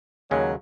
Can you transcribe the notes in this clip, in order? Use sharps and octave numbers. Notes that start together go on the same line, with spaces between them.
D#2 C#3 F#3 G#3 C#4